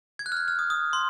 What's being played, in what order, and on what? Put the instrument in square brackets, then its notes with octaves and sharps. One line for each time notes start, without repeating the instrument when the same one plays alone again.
[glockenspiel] G#6
F#6
F6
F#6
F6
D#6
D#6
C6